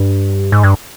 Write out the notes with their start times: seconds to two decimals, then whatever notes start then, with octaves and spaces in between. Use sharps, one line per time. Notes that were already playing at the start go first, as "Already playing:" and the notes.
Already playing: G2
0.52 G#2
0.63 G2